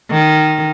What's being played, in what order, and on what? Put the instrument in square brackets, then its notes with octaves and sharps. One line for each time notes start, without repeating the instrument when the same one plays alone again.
[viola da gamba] D#3